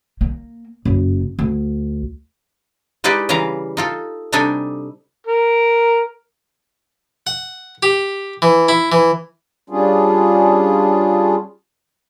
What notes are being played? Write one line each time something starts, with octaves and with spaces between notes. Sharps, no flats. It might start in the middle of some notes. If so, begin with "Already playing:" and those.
A#3
F#1
D2
G#3 D#4 E4 G4 B4 D5
C#3 E3 G3 F5 A#5
D#4 F4 A4
C3 G3 D4 D#4 A4 G#5
A#4
F#5
G4
E3
E4
E3
G3 C#4 D4 F4 G#4